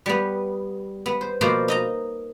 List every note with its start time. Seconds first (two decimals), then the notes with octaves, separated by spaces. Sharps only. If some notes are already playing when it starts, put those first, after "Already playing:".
0.06 G3 B3
1.06 B3
1.21 C5
1.41 B2 F3 A#3 C5 D5
1.68 D#4 D#5 A#5